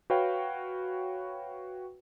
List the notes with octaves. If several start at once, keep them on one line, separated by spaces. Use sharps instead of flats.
F#4 B4 C#5 F5 G5